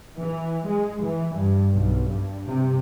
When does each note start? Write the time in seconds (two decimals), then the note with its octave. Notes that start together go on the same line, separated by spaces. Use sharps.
0.19 E3
0.68 G#3
1.04 E3
1.37 G2
1.77 B1
2.10 G2
2.47 C3